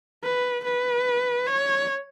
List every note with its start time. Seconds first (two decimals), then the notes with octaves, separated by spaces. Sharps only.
0.24 B4
0.65 B4
1.47 C#5